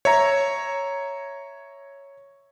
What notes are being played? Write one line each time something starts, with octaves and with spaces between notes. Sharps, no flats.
C#5 E5 A#5